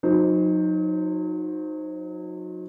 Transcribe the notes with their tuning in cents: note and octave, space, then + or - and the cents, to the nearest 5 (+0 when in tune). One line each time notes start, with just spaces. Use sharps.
F#3 -30 D#4 +0 C5 +0